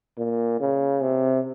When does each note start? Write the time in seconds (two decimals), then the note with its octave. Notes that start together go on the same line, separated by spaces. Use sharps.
0.18 A#2
0.60 C#3
1.02 C3